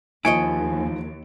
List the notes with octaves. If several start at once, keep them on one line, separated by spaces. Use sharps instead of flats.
D#2 F3 E4 C#5 D#5 G#5 C#7 D7